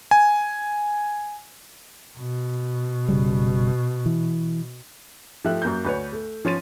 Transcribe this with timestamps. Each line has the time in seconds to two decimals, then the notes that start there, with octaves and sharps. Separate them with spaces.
0.11 G#5
2.18 B2
3.09 F#1 C#3 G3
4.06 E3
5.45 F3 A3 G4 E5 F#6
5.62 F#2 A#3 A#5 G6
5.84 D2 B4 C#5
6.12 A3
6.45 F3 C#4 C6 A6 D#7